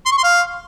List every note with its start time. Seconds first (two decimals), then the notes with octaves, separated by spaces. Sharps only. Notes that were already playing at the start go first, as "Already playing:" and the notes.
0.06 C6
0.12 C#6
0.18 C6
0.24 F5